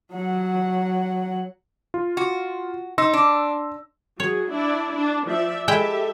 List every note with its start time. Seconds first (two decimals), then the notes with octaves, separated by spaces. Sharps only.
0.13 F#3 F#5
1.94 F4
2.17 F#4
2.98 D#4 C6 E6 A#6
3.13 D4
4.20 F#3 G#4 C#5
4.51 D4 E4 D5
4.96 D4
5.27 F3 D5 E5
5.68 G#3 E4 G4 A4 E5 G5